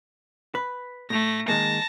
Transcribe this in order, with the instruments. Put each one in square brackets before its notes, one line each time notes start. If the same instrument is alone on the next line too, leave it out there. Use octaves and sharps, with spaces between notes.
[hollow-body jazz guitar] B4
[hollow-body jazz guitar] A2 [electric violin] A3 A#6
[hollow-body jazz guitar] D#3 G#3 A#3 [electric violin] A5 A#6